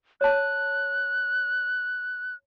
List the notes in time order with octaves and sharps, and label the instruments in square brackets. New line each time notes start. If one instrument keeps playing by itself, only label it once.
[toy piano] C#5 A5 [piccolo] F#6